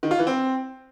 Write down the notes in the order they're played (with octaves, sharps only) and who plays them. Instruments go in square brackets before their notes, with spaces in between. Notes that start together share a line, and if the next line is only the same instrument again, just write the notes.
[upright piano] D#3
F4
E3
C4